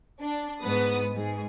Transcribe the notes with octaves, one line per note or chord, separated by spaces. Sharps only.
D4
G#2 B3 B4 D#6
G#2 G#4